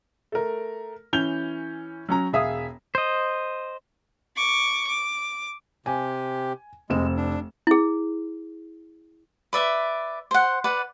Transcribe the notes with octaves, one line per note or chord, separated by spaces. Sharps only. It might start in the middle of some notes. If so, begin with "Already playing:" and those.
A3 A#4
E3 C#4 G6 F7 G7
F#3 C#4 A#5
E1 G#4 E5 F5 D#6
C5 D#5
C#6 D6
D6
C3 G4 G#5
F1 G#3 C4 E7
D4
E4 G#4
B4 D5 E5
C5 F#5
B4 D5 F#5